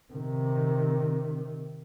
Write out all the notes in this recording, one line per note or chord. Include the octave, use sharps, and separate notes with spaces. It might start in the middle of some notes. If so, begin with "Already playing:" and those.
C3 D#3